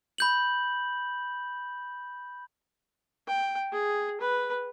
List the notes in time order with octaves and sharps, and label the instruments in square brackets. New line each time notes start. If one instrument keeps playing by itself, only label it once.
[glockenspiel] B5 G6 F#7
[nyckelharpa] G5
G#4
B4